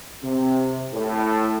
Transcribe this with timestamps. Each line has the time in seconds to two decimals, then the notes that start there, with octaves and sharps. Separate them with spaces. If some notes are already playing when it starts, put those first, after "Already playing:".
0.23 C3
0.93 A2